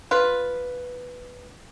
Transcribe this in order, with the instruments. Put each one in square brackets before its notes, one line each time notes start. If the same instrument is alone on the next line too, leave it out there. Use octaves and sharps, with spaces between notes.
[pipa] F4 B4